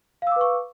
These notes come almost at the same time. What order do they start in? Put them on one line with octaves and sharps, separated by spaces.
F5 E6 D6 B4 C#6